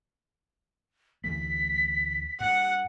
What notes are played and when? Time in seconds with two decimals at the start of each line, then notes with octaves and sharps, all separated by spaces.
1.24 D2 E3 A3 B6
2.40 G2 F#5